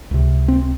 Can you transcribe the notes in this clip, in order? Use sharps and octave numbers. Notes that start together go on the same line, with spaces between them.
C#2 C3
C4